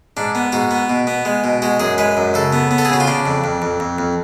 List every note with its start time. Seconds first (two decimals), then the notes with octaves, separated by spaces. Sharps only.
0.17 G#2 D4
0.35 B3
0.52 G#2 F#4
0.71 B3
0.90 B2
1.07 B3
1.25 G#3
1.44 B2
1.62 G#3 F#4
1.80 F#2 G#4
1.98 G#3 B4
2.17 F#2
2.34 C#3 A4
2.53 B3
2.71 B3
2.78 A4
2.85 G#4
2.90 C#3 F#4
3.00 F4
3.07 C#3 D4
3.26 F2
3.44 F2
3.62 F2
3.80 F2
3.98 F2